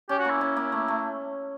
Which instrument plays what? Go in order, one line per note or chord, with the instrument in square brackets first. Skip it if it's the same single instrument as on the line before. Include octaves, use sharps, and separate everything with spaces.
[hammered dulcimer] C#4 [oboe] G4
[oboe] F#4
[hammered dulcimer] A#3
[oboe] E4
[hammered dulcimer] C#4
A#3
A3
A3